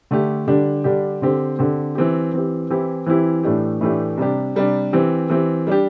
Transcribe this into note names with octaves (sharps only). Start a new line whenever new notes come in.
D3 A3 D4 G4
D3 G3 D4 G4
D3 G3 D4 G4
D3 C4 G4
D3 C4 G4
E3 C4 G4
E3 C4 G4
E3 C4 E4 G4
E3 C4 E4 G4
A2 E3 A3 D4 G4
A2 E3 A3 D4 G4
C3 G3 D4 G4
C3 G3 D4 G4
E3 C4 G4
E3 C4 G4
G3 D4 G4